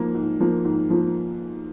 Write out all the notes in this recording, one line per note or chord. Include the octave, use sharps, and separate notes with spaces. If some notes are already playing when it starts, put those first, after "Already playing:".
Already playing: G#2 F3 A#3
G#2
F3 A#3
G#2
F3 A#3